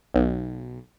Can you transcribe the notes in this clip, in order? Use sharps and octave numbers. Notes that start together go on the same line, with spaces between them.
B1